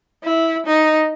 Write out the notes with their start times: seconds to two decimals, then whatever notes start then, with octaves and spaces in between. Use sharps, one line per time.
0.24 E4
0.66 D#4